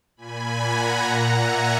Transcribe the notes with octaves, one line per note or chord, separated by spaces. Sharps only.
A#2 G#5 B5
F#5 A#5
A#2 F#5 A#5
E5 G#5